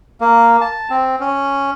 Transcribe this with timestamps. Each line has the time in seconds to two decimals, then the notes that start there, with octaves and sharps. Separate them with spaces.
0.21 A#3
0.61 A5
0.90 C4
1.20 C#4